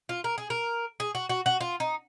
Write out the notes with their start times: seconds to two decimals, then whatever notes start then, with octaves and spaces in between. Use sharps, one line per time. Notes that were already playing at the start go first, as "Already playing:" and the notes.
0.09 F4
0.24 A#4
0.38 G#4
0.50 A#4
1.00 G#4
1.15 F#4
1.29 F#4
1.46 F#4
1.61 F4
1.80 D#4